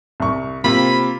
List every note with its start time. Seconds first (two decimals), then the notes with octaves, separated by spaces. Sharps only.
0.20 C2 C#6
0.64 C3 A#3 C4 F4 B5